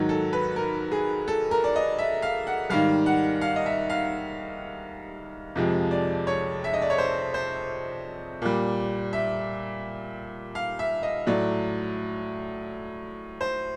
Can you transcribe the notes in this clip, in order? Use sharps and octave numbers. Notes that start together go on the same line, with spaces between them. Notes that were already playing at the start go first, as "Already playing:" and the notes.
Already playing: G#2 D#3 F#3
A4
B4
A#4
G#4
A4
A#4
D5
D#5
E5
F5
F#5
G#2 D#3 G3 F5
F#5
F5
D#5
E5
F5
F2 C3 F3 G#3
D5
C#5
E5
D#5
D5
C#5
C5
C5
A#2 G3
E5
F5
E5
D#5
A2 F#3 D5
C5